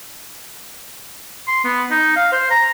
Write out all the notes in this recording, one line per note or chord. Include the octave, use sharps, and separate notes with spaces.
C6
B3
D#4
F5
C5
A#5